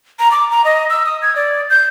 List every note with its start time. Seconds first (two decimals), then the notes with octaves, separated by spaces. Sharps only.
0.19 A#5
0.31 D6
0.51 A#5
0.65 D#5
0.90 E6
1.06 D#6
1.22 G#6
1.36 D5
1.70 G6